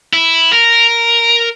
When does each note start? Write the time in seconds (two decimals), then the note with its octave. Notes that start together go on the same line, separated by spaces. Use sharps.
0.13 E4
0.53 A#4